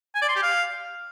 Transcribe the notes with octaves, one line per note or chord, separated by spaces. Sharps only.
G#5
D5
C6
G4
F5